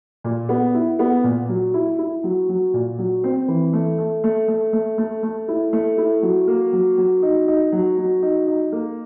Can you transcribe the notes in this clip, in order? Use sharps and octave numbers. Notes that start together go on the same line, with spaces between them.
A#2
B3
E4
B3
A#2
F#3
E4
E4
F#3
F#3
A#2
F#3
C4
E3
A3
A3
A3
A3
A3
A3
A3
E4
A3
E4
F#3
A#3
F#3
F#3
D#4
D#4
F#3
F#3
D#4
D#4
A#3